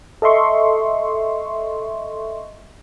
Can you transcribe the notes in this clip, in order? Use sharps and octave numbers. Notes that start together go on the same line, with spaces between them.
A4 D#5 E5 C6 C#6